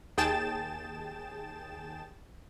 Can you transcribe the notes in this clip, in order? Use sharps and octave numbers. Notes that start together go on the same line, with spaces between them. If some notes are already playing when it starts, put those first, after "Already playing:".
D#2 G#4 G5 A5 A6 E7